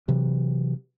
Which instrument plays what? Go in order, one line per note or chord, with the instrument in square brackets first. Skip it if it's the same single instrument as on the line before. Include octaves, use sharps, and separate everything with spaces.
[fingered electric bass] C3 E3 F#3